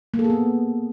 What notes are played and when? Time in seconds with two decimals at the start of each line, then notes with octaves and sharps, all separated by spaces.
0.14 A#3
0.19 A4
0.24 G#4
0.30 B3